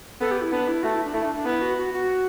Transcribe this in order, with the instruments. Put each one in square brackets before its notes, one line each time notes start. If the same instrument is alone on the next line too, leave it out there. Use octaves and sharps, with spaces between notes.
[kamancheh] B3 [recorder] A4
[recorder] G4
E4
[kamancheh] B3 [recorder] D4
[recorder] E4
[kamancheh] A3 [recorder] F#4
[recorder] E4
D4
[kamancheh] A3 [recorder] E4
[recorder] D4
D4
[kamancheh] B3 [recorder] E4
[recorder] F#4
F#4
F#4